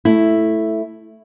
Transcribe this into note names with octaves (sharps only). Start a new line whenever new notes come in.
A3 E4